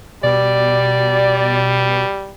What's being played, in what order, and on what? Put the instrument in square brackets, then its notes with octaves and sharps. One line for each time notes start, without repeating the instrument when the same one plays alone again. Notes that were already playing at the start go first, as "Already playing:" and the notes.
[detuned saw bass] B2 [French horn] G3 [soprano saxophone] D5